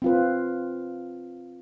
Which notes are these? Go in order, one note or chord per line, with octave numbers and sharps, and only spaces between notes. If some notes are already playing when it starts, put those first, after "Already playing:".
C4 F4 B4